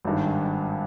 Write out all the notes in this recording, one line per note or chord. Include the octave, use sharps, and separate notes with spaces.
G#1 G2 D#3